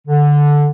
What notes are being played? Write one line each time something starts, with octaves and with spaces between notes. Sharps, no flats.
D3